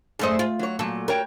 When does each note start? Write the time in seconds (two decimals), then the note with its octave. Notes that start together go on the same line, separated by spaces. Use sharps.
0.19 F#2 A3 G#4 C5 D#5
0.39 F4
0.59 F#3 C#5
0.79 A#2 F#3 A4
1.08 F#4 A#4 C#5 G5